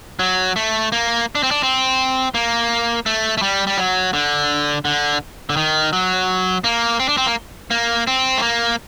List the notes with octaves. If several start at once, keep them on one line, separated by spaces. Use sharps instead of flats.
F#3
A3
A#3
D4
C4
D4
C4
A#3
A3
A3
G3
G3
F#3
D3
D3
D3
D#3
F#3
A#3
C4
D4
C4
A#3
A#3
C4
A3
A#3